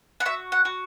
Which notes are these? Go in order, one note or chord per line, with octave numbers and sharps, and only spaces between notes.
F#5
F#4 E5
F#5
F#4